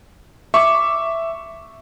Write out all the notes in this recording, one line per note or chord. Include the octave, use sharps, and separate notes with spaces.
E5 C#6 D6